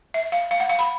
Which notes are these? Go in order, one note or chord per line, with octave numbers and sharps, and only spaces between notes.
E5
F5
F5
F#5
F5
B5